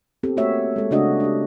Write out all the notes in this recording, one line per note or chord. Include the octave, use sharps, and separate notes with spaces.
B3 C4 G4 A4
A3 A#3 F#4 C#5 E5
G#3 A4
C#3 A3 D4 F#4 D#5
D4 G4